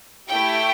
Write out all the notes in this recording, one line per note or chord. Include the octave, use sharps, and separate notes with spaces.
A3 E4 G4 G5